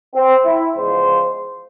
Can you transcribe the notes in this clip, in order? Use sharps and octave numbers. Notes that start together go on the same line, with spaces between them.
C4
E4
E2 C#3 F3 G#3 C5